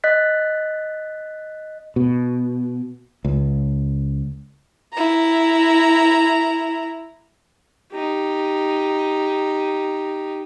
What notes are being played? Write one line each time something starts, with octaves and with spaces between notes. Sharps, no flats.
D#5 F#6 A6 B6
B2
C#2
E4 A#5
D#4 G4